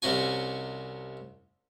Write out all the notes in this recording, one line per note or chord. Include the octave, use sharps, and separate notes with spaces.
C2 C3 C#4 F#4 G#5